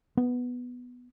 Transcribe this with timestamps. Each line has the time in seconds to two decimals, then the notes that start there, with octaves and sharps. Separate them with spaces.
0.17 B3